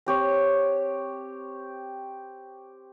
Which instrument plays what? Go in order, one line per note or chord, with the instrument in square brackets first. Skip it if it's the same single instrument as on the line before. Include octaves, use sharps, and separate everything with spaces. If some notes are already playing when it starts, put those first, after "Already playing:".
[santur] C4 G4 C#5